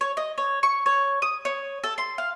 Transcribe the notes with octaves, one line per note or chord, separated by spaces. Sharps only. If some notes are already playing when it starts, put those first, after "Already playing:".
C#5
D#5
C#5
C#6
C#5
D#6
C#5
A4
C6
F5